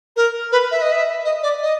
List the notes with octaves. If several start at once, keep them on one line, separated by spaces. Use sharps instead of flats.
A#4
B4
E5
D#5
E5
D#5
D5
D#5